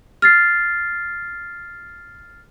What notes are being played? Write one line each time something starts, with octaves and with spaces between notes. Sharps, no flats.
F6 A6 C7